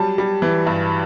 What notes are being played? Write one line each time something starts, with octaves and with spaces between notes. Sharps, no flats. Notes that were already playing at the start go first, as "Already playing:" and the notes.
Already playing: F#3 G3 A5
G3
E3
G2